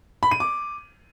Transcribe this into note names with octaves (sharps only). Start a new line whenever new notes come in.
B5
D#7
D6